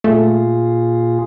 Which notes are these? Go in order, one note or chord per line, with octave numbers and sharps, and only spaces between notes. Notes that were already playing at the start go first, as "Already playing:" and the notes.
A#2 A3 F4 G#4